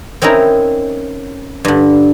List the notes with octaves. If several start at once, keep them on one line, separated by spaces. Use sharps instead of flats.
C4 C#4 D#4 E4 A#4
G2 D3